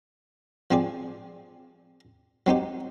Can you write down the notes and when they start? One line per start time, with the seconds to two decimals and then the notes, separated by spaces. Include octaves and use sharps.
0.71 F3 C4 G#4 D5
2.46 F#3 C4 D#4 G4